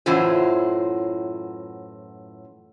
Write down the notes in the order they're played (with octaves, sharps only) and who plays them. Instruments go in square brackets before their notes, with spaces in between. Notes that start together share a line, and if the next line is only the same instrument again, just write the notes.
[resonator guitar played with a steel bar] F#2 A2 E3 F#3 F4 C5